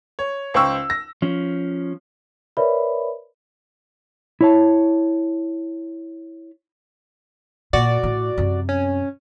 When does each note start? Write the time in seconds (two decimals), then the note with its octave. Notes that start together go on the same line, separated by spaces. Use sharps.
0.19 C#5
0.54 C#2 C5 G5 C#6 E6
0.90 A#6
1.22 F3 C#4
2.57 A#4 B4 C#5 D5 E5 B5
4.41 E4 C#5 A5
7.73 A#2 F#4 D5
8.03 A2
8.38 F#2 C3
8.69 C#4